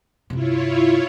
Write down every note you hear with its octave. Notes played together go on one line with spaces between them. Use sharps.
G2 C3 E4 F4 C#5